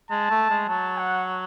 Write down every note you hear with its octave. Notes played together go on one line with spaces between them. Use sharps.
G#3 A5
A3
G#3
F#3 A5
F#5